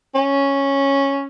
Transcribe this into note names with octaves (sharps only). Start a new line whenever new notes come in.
C#4